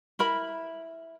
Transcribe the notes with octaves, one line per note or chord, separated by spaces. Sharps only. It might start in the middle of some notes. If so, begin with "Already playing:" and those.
E4 A#4 B5